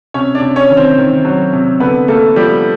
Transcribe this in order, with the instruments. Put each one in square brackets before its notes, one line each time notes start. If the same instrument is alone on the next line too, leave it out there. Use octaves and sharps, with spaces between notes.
[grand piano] C3 C#4 C#5
D4 D5
C3
C#4 C#5
D#3
C4 C5
D#3
F#3
C3
D3 B3 B4
A3 A#3 A4
F3 G3 G4